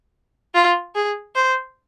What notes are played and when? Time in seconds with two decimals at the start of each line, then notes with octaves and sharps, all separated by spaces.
0.55 F4
0.95 G#4
1.35 C5